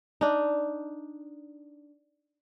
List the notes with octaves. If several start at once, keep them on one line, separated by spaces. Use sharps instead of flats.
D4 D#4